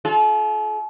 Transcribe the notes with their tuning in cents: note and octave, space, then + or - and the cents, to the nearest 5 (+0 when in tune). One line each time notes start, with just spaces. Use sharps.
F4 +0 A4 -45